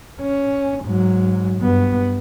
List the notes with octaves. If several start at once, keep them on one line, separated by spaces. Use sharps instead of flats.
C#4
G#2 F#3
G2 B3